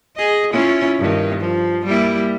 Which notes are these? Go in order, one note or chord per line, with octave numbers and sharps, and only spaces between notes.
G#4 D#5
C#4 E4 F4
G2 D#3
F3
G3 A#3 E4